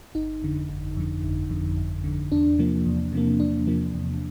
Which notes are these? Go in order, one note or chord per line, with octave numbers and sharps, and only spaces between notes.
G1 D#4
F2 D3
G1
F2 D3
G1
F2 D3
G1
F2 D3
E2 D4
C3 F3 A#3
E2
C3 F3 A#3
E2 D4
C3 F3 A#3
E2